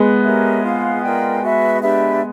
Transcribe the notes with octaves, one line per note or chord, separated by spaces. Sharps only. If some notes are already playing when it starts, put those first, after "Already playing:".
Already playing: G#3 B3
G4 A#4 C#5 E5
F4 G#4 C5 F5
F4 A#4 D5 G5
F#4 B4 E5
D4 G4 B4 E5